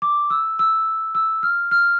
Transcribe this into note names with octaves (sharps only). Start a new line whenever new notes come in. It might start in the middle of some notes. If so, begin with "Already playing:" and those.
D6
E6
E6
E6
F6
F6